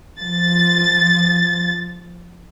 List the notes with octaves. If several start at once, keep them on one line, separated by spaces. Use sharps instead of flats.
F3 A6